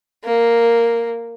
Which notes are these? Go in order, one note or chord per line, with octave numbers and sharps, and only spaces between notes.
A#3